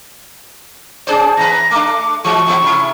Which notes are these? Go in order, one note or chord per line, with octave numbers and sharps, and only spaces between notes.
C#4 G#4 C5 D5
E2 B4 A#6
A3 D4 D6
E3 G#3 F#4 C#6
A2 E3 B3
C3 E4